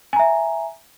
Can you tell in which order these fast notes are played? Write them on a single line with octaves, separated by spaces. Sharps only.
G#5 A#5 E5